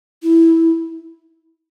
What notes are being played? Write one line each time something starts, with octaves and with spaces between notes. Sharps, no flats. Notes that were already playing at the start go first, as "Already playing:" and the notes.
E4